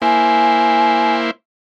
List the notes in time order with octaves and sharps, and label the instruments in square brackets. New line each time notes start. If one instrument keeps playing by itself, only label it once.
[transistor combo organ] A#3 E4 C5 [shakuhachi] G#5